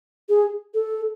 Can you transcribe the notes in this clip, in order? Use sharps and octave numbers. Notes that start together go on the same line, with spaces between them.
G#4
A4